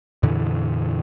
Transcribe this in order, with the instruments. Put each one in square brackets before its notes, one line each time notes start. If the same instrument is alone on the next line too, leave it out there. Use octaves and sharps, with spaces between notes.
[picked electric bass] F2 A#2 D3 E3